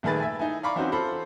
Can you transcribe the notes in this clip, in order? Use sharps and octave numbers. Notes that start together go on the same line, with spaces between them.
A#1 D#3 A3 G#4 B4 A6
E5 G#5
D#4 E4 G#5
D5 F5 A#5 B5 C#6 D6
E3 C4 C#4 D#4 F#4 C5
F4 A4 C5 B5